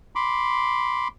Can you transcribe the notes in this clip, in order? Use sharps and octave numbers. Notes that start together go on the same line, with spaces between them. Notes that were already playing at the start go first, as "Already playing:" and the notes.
B5 C6 D6